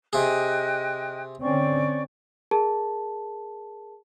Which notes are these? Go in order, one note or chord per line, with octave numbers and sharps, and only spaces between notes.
C3 G#4 D#5 G5 F#6
D3 C4 C#4 D5 C#6
G#4 A#4 A5